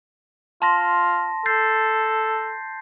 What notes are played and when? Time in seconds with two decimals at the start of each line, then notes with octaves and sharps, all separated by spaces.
0.62 F4 A5 C6 A#6
1.46 A4 G6 A6 C7